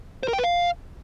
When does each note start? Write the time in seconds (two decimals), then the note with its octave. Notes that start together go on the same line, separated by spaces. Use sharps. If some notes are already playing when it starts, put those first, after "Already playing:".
0.23 C5
0.28 A#4
0.33 G5
0.38 B4
0.44 F5